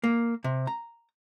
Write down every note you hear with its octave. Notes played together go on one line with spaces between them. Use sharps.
A#3
C3
A#5